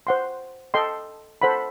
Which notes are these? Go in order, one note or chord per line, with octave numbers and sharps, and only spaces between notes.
C5 F#5 C6
A4 D#5 G5 C6
A4 C5 F#5 B5